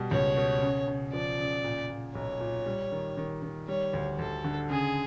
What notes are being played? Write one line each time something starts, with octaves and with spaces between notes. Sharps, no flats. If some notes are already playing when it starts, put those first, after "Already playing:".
Already playing: B2 G3
C#2 C#5
B2
C#3
C#3
F3 D5
C#3
A#2
A#2
B1 C#5
A#2
G3
D#3
D#3
D#3
G3 C#5
D2
D2 A4
D3
C#3 G#4